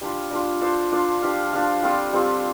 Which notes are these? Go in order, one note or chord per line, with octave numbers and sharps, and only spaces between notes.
G3 D4 F4
G3 D4 F4
D4 F4 A4 C5
D4 F4 A4 C5
F3 D4 G4 F5
F3 D4 G4 F5
G3 C4 F4 A4
G3 C4 F4 A4